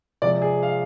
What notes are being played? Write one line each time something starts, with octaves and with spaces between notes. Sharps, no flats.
C3 F3 G#3 D5
G#4
F5